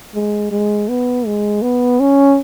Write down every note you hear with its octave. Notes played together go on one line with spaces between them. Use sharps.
G#3
G#3
B3
G#3
B3
C#4